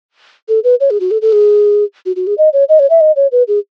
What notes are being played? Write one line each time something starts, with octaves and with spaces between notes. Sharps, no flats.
A4
B4
C#5
G#4
F#4
A4
A4
G#4
F#4
F#4
G#4
D#5
C#5
D#5
C#5
E5
D#5
C#5
B4
G#4